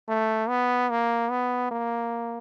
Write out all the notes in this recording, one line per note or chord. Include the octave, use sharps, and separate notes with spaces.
A3
B3
A#3
B3
A#3